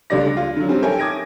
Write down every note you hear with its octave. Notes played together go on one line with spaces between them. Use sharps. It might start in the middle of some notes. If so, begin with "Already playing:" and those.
C#2 D3 G3 A3 D5 A#6
F4
D3 F#3
G3 C4 C#4
A4 A#4 C#5 E5 G5 G#5
D6 D#6 G#6 A#6 D7